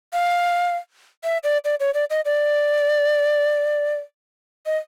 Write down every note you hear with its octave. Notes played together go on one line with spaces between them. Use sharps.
F5
E5
D5
D5
C#5
D5
D#5
D5
D#5